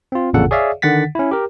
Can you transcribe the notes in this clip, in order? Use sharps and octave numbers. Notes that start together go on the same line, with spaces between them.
C4 F4
A1 F2 A#2 C#3 A4 F#5
G#4 C#5 D5 E5 F5
D3 D#3 F#5 A6 B6
C#4 E4
G4 A#4